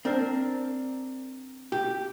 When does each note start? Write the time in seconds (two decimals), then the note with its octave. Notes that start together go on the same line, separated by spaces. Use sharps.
0.05 C4 D4 A#4
1.72 G4